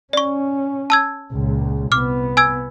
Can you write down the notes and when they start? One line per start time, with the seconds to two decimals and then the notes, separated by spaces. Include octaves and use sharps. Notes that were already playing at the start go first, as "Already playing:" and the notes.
0.13 C#4 D5 C#6
0.90 A5 E6 G#6
1.32 C#2 A#2
1.92 C2 B3 D6 F6
2.37 G#5 E6 G#6